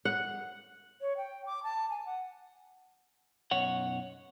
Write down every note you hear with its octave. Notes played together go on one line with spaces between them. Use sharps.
F#5
C#5
G5
D6
A5
G#5
F#5
B1 F#2 C#5 F#5